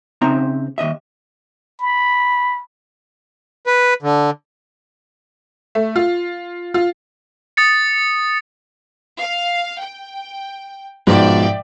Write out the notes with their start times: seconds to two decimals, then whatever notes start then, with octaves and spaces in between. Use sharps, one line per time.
0.22 C#3 C4 D#4 C5 E5 A#5
0.78 D#2 A#2 D#5 E5
1.80 B5
3.66 B4
4.03 D3
5.75 A3
5.96 F4
6.74 F4
7.57 D#6 A6 C#7
9.18 F5
9.78 G5
11.07 G#2 B2 F3 D5 E5 G5